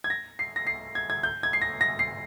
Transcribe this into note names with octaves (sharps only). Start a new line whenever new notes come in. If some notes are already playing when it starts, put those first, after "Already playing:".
G#6
A#6
C7
A#6
C7
G#6
G#6
G6
G#6
C7
A#6
A#6
C7